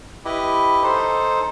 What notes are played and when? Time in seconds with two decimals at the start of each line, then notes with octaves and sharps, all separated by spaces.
0.25 E4 G4 B4 D#5
0.83 D#4 A4 C5